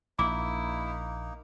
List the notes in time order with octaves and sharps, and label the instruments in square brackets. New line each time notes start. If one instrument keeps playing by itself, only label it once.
[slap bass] A#1 [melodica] A#3 D#4 [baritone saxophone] E4 [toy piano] D6